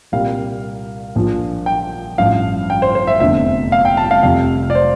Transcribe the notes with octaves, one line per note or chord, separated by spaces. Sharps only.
C2 A#2 G3 F5
A#1 A#2 F3
G5
A1 G2 F3 F5
G5
C5
C5
E5
F1 E2 D3 E5
F5
G5
A5
F5
F1 F2 C3 F5
D5
C5